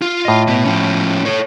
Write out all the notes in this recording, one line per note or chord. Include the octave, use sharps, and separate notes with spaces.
F4
A2 D#5
B2 B3
F3 C#4
A4 C#5